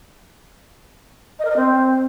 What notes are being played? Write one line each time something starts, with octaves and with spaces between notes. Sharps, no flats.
D#5
A#4
D#5
C4